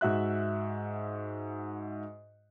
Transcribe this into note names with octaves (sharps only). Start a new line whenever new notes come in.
G#2 F#4 E5 F#6